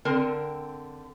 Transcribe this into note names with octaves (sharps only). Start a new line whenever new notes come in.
D3 C4 A#4